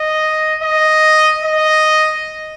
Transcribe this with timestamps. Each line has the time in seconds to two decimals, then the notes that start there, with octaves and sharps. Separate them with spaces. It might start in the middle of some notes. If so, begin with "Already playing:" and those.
Already playing: D#5
0.64 D#5
1.44 D#5